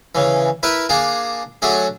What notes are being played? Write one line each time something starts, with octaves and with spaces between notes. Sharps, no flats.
C#3 E3
E4 A#4 B4
A#3 D4 G#4
F#3 A3 D4 G#4